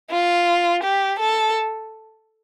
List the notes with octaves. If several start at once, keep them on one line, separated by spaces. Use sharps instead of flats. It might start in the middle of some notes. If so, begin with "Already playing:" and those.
F4
G4
A4